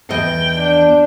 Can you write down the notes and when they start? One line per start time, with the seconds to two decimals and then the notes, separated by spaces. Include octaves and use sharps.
0.10 E2 D#5 G5
0.56 D4